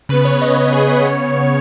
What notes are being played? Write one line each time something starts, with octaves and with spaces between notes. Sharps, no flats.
C#3 B3 B4
C#5
D#5
B4
G#4
B4
C#3 B3 C#5